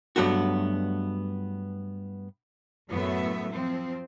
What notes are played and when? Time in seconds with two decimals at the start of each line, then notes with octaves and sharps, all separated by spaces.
0.16 G2 F#3 A3 B3 F#4
2.90 F#2 A2 A3 B3 E5
3.51 F3 C4